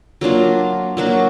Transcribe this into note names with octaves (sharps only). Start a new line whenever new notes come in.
F#3 A#3 D4 F4
F#3 A#3 D4 F#4